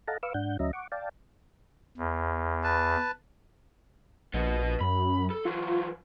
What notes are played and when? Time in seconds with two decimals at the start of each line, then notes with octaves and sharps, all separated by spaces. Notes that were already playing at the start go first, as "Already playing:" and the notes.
0.08 A4 D#5 F5 F#5 A5 A#5
0.23 B4 F5 C#6 D6 E6
0.34 G#2 D4 F#5 G6
0.59 D2 F#3 C#4 D#5 E5 A#5
0.73 F#5 C#6 D6
0.92 D5 F5 G5 A5
1.97 E2
2.63 B4 A5
4.34 A#1 B3 D#5
4.81 F#2 B5
5.30 A4
5.45 E3 F#3 F4